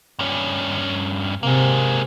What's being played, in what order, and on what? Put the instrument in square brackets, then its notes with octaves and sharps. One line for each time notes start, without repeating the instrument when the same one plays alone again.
[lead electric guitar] G2 C#4
[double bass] C3 [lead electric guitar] G#3 A#3